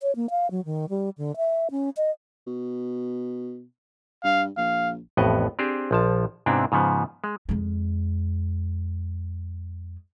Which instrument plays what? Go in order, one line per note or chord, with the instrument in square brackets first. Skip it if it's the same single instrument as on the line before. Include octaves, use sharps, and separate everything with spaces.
[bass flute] C#5
A#3
F5
F#3
D#3
G3
D3
E5
C#4
D#5
[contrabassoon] B2
[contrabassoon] G2 [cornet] F5
[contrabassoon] A#1 [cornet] F5
[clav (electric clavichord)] A1 F2 A2 B3 D#5
C4 D4 G4 G#4 C5
A#1 F3 A5
G#2 C3 B3 C4 D4 E4
G#2 C#3 F3 B3
G#3
[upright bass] F2 G#3